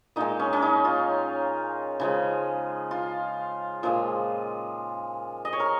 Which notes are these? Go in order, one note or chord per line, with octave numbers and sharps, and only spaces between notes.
A#2 G#3 D#4
C#4
C#4
D#4
F4
C#3 F3 G#3
F4
A#2 F3 G#3
D#5
C#5
A#4